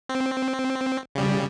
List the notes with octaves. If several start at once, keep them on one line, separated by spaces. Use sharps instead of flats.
C4
C#3 G3